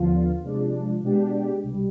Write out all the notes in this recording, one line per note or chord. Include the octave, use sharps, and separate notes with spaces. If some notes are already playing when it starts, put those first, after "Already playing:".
Already playing: D#2 D3 F3 B3 F4
C3 F3 G#3 D4
B2 G#3 B3 D4 G4
C2 B2 G3